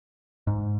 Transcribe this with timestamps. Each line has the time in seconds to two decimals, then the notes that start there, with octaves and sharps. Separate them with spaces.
0.47 G#2